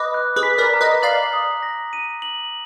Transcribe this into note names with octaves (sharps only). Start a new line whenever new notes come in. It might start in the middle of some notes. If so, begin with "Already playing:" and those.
Already playing: B4 D#5 D6
F#6
G#4 B4
B6
A#4 D5
A#5
B4 D#5
D5 F5 F#7
D#6
A#6
D#7
F#7